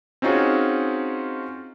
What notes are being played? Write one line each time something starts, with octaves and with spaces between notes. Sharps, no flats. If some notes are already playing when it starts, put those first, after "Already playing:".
C4 C#4 D#4 F4 F#4 G#4